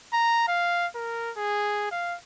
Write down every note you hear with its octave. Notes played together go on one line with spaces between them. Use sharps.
A#5
F5
A#4
G#4
F5